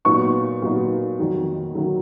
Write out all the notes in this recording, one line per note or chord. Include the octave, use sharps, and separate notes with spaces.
A#2 F#3 B3 D#4 C#6
A#2 F#3 B3 D#4
F2 D#3 F#3
D#3 F#3